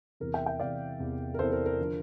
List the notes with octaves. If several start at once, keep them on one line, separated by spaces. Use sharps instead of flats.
E2 C3 E3 A#4
E5 G5
E5 G5
E2 C3 E3 D5 F5
E2 C3 E3
A#4
E2 C3 E3 A4 C5
A#4
A#4
D3 F3